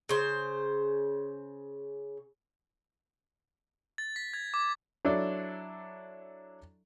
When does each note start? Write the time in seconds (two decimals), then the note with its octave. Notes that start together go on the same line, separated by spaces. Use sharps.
0.09 C#3 C5
3.98 A6
4.16 B6
4.34 G#6
4.54 D6
5.05 F#3 D4 E4 A4 D5